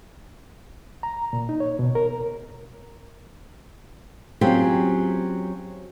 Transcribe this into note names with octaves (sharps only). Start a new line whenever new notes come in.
A#5
A#2
D#4
C#5
B2
A#4
F#3 C4 C#4 F4 G4 G#4